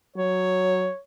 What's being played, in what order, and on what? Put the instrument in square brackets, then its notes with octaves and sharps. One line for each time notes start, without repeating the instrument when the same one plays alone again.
[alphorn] F#3 [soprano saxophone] C#5